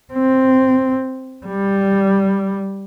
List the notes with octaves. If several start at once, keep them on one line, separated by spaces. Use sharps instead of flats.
C4
G3